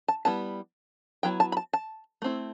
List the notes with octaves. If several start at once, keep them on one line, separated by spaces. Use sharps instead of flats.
A5
G3 B3 E4 A5
F#3 B3 E4 G5
A5
B5
A5
A5
A3 C4 E4